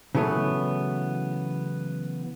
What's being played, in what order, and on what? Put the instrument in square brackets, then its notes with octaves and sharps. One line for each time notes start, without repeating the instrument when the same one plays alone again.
[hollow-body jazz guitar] C#3 E3 F#3 A3 B3